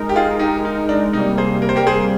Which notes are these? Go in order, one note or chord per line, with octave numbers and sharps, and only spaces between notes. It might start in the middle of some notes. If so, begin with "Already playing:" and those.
Already playing: G#3 D#4 A#4
G4
F4 G#4
D#4 G4
D#4
D4
C3 G3 A#3 D#4
G#4 C5
A#4
C5
G4 A#4
G#4 C5